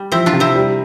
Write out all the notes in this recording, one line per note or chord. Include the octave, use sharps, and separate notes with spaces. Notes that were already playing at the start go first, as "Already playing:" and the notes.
Already playing: G3
F3 C4 E4
D4 F4
C3
C4 E4
G3